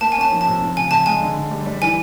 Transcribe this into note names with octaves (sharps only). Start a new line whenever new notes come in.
A#3 A5
G#5
C#4 A5
F3
A5
C3
F3
C#3 G#5
C#3 A5
G#3 G#5
D3
D3
G3
G3
E3 G#5